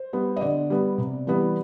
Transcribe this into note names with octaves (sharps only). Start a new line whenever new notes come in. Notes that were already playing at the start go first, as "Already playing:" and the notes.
Already playing: C5
G3 B3
D#5
D3 D5
G3 B3
C3
E3 G3 B3